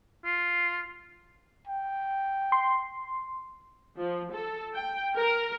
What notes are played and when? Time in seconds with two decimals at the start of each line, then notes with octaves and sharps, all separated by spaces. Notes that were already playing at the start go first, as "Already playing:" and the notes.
0.25 F4
1.67 G5
2.52 C6
3.97 F3
4.32 A4
4.75 G5
5.16 A#4